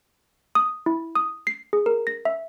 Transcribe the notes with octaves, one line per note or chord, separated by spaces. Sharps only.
D#6
E4
D#6
C7
G#4
A#4
A#6
E5